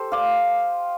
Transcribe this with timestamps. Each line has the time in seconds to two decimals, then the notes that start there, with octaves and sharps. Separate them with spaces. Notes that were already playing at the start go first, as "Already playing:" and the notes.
Already playing: G4 A4 C5
0.12 D5 F5